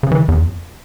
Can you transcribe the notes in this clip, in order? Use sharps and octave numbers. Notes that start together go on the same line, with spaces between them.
C#3
E3
E2
F2